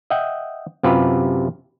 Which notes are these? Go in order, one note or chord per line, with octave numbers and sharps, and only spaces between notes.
D#5 E5 F#5 G5
F#2 C3 F4 G4 B4